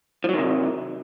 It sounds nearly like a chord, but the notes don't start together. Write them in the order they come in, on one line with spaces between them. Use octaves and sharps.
F3 F#3 D#3 C3